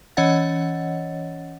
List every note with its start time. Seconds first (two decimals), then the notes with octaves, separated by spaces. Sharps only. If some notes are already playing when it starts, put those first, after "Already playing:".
0.17 E3 C#4 C#5 D#5 F#5 A6